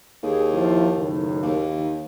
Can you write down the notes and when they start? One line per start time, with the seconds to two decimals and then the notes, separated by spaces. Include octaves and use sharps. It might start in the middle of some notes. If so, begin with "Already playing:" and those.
0.23 D#2 G#4
0.53 F3 E4
0.96 F#1 A2 D#3
1.42 D#2
1.76 D#3